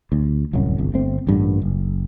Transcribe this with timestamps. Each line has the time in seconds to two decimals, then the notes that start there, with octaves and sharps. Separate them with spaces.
0.12 D2
0.53 D1 C2 F#2 F#3
0.78 G1 C2
0.94 G1 A3 C4
1.27 A1 G2 A#2 D3
1.62 F#1